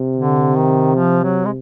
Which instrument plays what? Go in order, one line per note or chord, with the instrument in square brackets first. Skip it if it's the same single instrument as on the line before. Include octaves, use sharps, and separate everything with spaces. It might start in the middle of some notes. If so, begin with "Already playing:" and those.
Already playing: [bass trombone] C3
[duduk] D3
D#3
F3
F#3
G#3